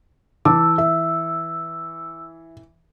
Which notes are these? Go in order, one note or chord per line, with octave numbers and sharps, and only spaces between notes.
E3 A5 D6 E6
E5